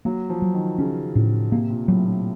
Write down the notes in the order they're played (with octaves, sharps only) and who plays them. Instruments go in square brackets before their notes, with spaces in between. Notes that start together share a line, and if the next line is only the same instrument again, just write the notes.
[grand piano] F#3 [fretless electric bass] A#3
[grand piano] F3
[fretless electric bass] F#3
[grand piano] D#3
[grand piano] C#3 [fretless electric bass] C#4
[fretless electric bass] A2 [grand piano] C#3
[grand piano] C3 [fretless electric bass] A#3
[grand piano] A#2
[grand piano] A2 [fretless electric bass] F#3
[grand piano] A#2